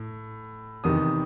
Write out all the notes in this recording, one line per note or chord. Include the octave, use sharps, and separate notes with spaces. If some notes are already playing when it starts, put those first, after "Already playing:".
Already playing: A2
E2 C3 D#3 D#6